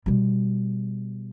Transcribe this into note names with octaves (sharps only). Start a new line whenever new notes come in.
B2 G3